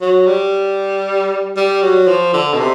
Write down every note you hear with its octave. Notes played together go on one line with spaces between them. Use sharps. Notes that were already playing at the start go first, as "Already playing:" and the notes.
F#3
G3
G3
F#3
F3
D3
B2
C3